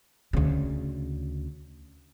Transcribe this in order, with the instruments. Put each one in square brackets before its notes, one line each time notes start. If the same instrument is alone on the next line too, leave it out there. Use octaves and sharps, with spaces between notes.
[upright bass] D2 C#3